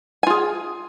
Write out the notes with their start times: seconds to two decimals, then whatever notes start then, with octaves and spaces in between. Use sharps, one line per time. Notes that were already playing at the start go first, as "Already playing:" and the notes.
0.23 G#5
0.27 F4
0.30 G#4